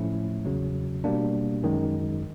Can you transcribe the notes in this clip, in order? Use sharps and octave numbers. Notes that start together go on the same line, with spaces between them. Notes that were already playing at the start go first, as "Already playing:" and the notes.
Already playing: A2 F3 A3 C#4 E4
E2 C#3 F#3
B2 G3 A#3 D4
F#2 D#3 G#3